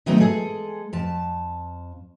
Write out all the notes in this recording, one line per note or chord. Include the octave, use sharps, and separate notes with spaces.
D#3 F#3 A3 B3 C4 D#4
G#3 G#4 A4
F2 A5